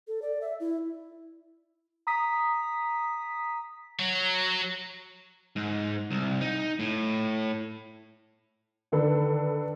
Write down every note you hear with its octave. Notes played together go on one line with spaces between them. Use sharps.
A4
D5
E5
E4
A#5 D#6 B6
F#3
G#2
C2
D#4
A2
D3 D#3 D4 A4 B4